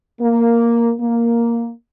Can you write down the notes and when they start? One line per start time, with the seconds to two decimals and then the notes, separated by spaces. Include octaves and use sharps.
0.21 A#3
0.99 A#3